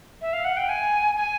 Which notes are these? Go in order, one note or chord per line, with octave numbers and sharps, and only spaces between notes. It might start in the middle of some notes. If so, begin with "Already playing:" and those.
E5
F5
F#5
G5
G#5
G#5